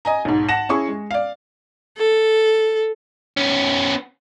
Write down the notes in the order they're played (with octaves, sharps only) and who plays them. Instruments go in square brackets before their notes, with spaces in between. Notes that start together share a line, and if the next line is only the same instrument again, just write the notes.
[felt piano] D#5 G#5 A#5
B1 G#2
F#5 A5 A#6 E7
C#4 E4 G#4 C#6
G#3
D5 F5
[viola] A4
[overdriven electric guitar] B3 C#4